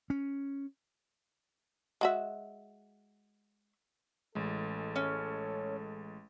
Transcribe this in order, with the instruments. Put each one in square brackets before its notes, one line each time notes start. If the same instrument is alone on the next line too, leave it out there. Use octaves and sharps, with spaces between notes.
[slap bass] C#4
[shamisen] G#3 F#4 E5
[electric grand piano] A1 G#3 [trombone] A4
[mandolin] C#4